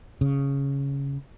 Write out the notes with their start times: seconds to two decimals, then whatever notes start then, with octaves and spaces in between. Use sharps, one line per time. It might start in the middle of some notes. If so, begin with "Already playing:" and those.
0.21 C#3